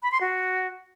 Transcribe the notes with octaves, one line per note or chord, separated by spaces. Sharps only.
B5
C6
F#4